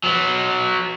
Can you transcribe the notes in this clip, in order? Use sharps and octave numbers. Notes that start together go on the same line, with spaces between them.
F#3 B3